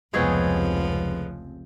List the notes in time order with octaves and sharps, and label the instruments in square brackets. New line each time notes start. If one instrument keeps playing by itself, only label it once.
[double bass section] F1 C#2 [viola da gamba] F3 [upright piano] G#3 B3 [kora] C4 G#4 C#5